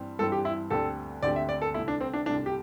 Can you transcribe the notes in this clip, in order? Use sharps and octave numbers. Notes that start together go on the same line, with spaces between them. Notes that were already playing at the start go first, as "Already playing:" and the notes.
Already playing: G2 E3 G3 C4
G2 E3 G3 C4 A4
G4
E4
D2 D3 C4 G4 A4
D2 D3 C4 G4 D5
E5
D5
A4
C2 C3 A3 E4
D4
C4
D4
C2 C3 A3 D4
G4